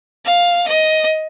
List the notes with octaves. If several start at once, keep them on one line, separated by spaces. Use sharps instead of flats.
F5
D#5